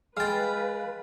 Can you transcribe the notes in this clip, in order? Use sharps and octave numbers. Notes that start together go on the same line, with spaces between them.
G#3 B4 F5 G5 F6 A6